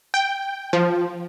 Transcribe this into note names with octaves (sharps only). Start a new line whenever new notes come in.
G5
F3